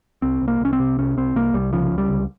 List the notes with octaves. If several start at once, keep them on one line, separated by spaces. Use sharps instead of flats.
C2 C4
C2
A#3
C2 C#4
C4
C3
C2 C#4
C2 C4
C2 A#3
C2 G3
C#3 F3
C#2
G3
C#2